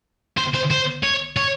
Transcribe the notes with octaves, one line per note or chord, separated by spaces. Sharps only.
C5
C5
C5
C#5
C#5